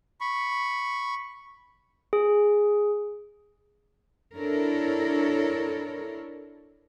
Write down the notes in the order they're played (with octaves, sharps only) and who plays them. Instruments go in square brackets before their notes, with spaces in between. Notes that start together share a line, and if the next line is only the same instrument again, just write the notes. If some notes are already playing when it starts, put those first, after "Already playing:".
[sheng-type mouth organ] B5 C#6
[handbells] G#4
[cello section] D4 E4 A4 A#4 C#5